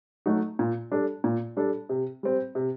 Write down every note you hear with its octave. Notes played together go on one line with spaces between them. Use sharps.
F#3 A3 D#4 F#4
A#2
G3 D4 A4
A#2
G3 D4 A4
C3
G3 C4
C3